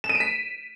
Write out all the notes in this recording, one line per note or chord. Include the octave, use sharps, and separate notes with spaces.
E7
D#7
D7
B6